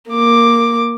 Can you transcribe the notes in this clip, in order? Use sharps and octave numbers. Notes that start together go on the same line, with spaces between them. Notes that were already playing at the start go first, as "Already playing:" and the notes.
A#3 D6